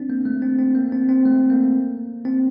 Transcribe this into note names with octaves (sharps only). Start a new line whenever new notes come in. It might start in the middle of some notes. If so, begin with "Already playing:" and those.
Already playing: C4 D4
A#3
A3
C4
C4
A#3
C4
C4
A3
A#3
C4